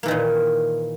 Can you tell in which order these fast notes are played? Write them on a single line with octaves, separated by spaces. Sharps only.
A#3 E3 D#3 A#2